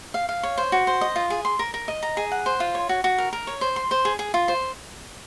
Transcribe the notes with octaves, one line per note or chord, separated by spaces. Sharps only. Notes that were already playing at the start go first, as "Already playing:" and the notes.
F5
F5
C#5
C5
F#4
C5
D#5
F4
G#4
C6
A#4
A#4
D#5
A#5
G#4
F#5
C5
F4
C#5
F#4
F#4
A#4
A#4
C#5
C5
C6
C5
G#4
G#4
F4
C5